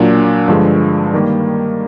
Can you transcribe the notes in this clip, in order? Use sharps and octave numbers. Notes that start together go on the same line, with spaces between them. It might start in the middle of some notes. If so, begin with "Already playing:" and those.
Already playing: A#2 F#3 A#3 D4
G2 D3 F3 G#3
D#3 G3 A#3